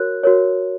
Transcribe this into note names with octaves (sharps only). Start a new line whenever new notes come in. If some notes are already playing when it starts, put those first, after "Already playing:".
Already playing: F#4 A#4 C#5 F#6
F#4 A#4 C#5